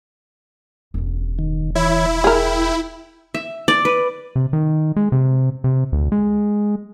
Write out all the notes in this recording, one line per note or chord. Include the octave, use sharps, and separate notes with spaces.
E1 A1
D#3
E3 E4 C#5 G#6
G#4 A#4 G5
E5
D5
B4
C3
D#3
G#3
C3
C3
D2
G#3